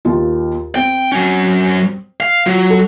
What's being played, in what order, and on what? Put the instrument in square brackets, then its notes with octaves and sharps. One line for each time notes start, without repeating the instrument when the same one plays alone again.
[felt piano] D#2 F4
[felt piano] C4 [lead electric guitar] G5
[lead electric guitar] F#3 C#4
F5
[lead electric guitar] F#3 [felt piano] F4
[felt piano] A4